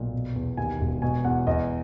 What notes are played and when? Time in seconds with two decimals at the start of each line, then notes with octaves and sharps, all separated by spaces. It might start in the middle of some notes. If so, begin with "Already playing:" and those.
Already playing: B1 A#2
0.13 B2
0.36 E2
0.57 D#2 G#5
0.81 E1
1.02 B2 G#5
1.24 E2 F#5
1.47 E2 D#5